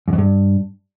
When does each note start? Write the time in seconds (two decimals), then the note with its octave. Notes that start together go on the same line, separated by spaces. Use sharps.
0.08 F#2
0.13 F2
0.18 G2